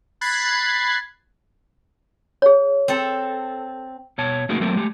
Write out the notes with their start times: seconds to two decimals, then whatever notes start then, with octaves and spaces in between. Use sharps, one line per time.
0.21 B5 F#6 G#6 A6 B6 C7
2.42 G#4 C#5
2.88 C4 A4
4.18 B2 C#5 A5
4.49 A3 A#3 D#4 F#4 G#4 A#4
4.60 F#3 A3 A#3 C4 A4 A#4
4.75 G#3 A3 G4